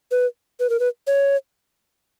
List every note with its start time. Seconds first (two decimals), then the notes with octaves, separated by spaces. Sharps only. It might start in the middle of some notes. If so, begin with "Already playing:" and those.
0.11 B4
0.60 B4
0.70 A#4
0.80 B4
1.07 C#5